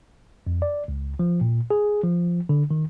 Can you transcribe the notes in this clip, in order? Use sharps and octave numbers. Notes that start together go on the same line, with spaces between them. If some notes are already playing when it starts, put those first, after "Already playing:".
F2
D5
C#2
F3
A#2
G#4
F3
D3
D#3